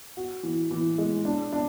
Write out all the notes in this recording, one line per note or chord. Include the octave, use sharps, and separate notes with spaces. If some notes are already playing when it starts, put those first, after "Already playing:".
F#4
E3
E3
G#3
D4
D4